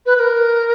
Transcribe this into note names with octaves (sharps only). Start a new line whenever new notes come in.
B4
B4
A#4